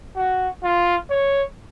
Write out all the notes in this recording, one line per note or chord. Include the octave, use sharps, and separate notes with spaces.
F#4
F4
C#5